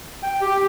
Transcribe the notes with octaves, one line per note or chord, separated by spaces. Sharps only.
G5
G4